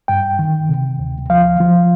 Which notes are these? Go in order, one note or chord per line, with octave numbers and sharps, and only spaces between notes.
G2 G5
D#3
C3
D2
F3 F5
F3